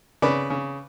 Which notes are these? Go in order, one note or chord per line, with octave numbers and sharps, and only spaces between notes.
C#3 B4 D5
C#3